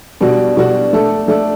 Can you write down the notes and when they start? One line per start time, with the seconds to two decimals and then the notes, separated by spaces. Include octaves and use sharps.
0.21 B2 G3 D4 F#4
0.56 B2 G3 D4 F#4
0.93 A3 D4 A4
1.28 A3 D4 A4